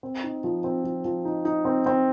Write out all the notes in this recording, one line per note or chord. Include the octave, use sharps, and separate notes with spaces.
C4
D#4
F3
C4
F3
F3
D#4
D#4
C4
C4